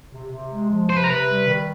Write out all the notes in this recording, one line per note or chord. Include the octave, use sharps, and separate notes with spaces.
C3
C3
G#3
F3
C3 C5
B4
A#4
C3 B4
G3
D#3